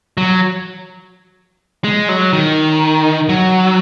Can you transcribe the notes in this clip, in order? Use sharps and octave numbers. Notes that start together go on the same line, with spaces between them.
F#3
G#3
F#3
D#3
F#3